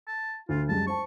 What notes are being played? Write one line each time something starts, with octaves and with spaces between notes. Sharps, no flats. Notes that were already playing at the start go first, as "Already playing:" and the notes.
A5
D2 F4
F#2 G3 G#3 A5
C5 A5 C#6